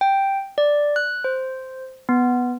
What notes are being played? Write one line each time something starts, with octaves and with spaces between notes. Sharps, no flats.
G5
D5
F#6
C5
B3